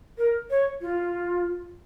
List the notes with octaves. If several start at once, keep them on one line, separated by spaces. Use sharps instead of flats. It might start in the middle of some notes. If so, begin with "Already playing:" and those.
A#4
C#5
F4